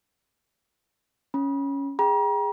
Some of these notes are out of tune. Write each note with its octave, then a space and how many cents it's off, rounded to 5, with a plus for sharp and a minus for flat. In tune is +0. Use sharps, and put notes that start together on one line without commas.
C#4 +0 B5 -35
G#4 -10 G5 +0 A#5 +40